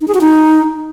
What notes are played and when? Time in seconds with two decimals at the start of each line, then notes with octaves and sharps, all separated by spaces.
0.01 D#4
0.08 G#4
0.14 F#4
0.21 D#4